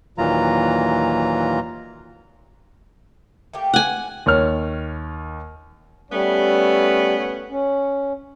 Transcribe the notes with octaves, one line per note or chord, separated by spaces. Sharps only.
D#2 A#2 E3 F#3 F4 A#5
A3 A#3 G4
F#5 G#5
D#2 C#5 F6
G3 A3 B3 C#4
C#4